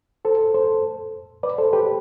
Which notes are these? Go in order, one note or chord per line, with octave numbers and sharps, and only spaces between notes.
A4 C5
A4 C5
B4 D5
A4 C5
G4 B4